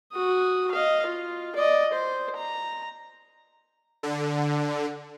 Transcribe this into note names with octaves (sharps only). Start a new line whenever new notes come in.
F#4 D#6
D#5 F5
F4
D5 D#5
C5
A#5
D3